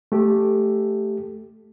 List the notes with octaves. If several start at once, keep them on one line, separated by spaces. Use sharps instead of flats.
A3 G4 A4